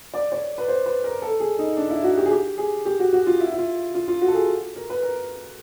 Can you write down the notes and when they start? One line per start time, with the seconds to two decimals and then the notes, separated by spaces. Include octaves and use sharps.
0.14 D5
0.32 C#5
0.58 B4
0.68 C5
0.86 B4
1.04 A#4
1.22 A4
1.40 G#4
1.58 D#4
1.77 D4
1.90 E4
2.03 F#4
2.17 G4
2.26 G#4
2.31 G4
2.58 G#4
2.86 G4
2.99 F#4
3.13 F#4
3.26 F4
3.40 E4
3.52 E4
3.58 F4
3.94 F4
4.08 F4
4.21 F#4
4.28 A4
4.35 G#4
4.76 A#4
4.90 B4
5.03 A#4